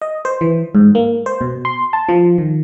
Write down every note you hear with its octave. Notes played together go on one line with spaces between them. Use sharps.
D#5
C5
E3
G#2
A#3
C5
B2
C6
A5
F3
D#3